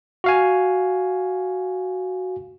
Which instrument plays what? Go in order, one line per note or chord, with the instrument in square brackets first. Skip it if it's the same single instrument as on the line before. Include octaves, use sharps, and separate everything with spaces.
[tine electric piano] F#4 F5 G#5